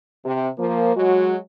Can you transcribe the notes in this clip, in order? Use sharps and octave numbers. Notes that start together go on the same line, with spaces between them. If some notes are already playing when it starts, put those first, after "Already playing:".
C3
F3 A#3
F#3 G#3 F#4